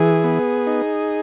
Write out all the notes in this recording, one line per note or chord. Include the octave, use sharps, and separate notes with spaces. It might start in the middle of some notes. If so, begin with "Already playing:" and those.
Already playing: E3 G#4
B3
D#4